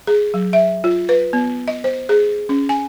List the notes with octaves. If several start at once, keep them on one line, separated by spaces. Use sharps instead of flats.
G#4
F#3
E5
F4
B4
B3
D#5
C5
G#4
C#4
G#5